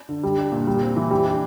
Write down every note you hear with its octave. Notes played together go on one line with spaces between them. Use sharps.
D3
G3
D4
A#2
G3
C4
E3
G3
D4